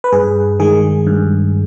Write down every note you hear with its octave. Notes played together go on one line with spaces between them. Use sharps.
B4
G2 G#4
D#3 G#3 G#4
G2